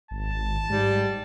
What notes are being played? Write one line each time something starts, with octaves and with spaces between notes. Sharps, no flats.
G#1 A5
G#2 G3